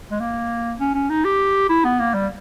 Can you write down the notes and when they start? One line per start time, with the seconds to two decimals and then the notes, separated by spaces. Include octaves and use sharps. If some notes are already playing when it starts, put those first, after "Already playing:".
0.11 G#3
0.20 A#3
0.80 C#4
0.94 C#4
1.10 D#4
1.25 G4
1.69 E4
1.85 B3
2.00 A#3
2.14 G3